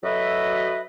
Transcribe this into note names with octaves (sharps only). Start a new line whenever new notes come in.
F#3 F#4 A4 B4 D#5 E5